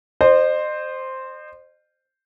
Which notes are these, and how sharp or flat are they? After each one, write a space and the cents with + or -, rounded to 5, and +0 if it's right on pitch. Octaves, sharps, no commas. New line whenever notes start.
C5 +0 D#5 -40